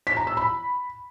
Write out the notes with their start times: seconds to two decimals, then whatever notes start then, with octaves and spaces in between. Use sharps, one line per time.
0.07 B6
0.17 A#5
0.27 E6
0.37 B5